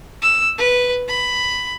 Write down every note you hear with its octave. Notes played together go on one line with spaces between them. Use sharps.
E6
B4
B5